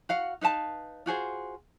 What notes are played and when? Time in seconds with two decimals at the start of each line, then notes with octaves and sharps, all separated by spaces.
0.09 F#4 F5 F#5
0.41 D#4 B4 F5 A5
1.06 F4 F#4 G#4 C5